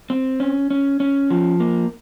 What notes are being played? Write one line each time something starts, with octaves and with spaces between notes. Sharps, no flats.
C4
C#4
C#4
C#4
F3
A#3